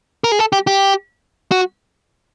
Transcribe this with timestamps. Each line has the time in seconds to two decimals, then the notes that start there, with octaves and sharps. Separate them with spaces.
0.24 A#4
0.32 G#4
0.39 A4
0.53 G4
0.67 G4
1.52 F#4